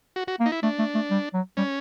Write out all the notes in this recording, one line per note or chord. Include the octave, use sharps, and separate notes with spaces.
F#4
F#4
A#3
D#4
E4
A3 D4
A3
A3
G3
F#3
G3 C#4